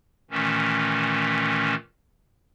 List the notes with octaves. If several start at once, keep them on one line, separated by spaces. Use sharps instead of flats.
A#2 D#3 E3 A3 C#4